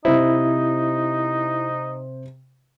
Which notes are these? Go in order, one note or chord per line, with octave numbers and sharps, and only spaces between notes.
C3 D#4 E4 C5